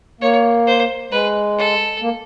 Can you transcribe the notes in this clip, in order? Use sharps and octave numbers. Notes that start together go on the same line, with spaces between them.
A#3 C#5
C5
G#3 B4
A4
A#3